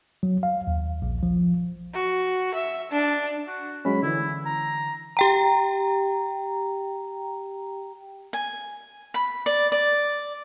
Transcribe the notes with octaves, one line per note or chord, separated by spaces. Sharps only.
F#3
F5
D#2
A#1
F3
F#4
E5
D4
F#4
F#3 G#3 C#4 B5
D3 E3 E4
A#5
G4 G5 A#5
G#5
B5
D5
D5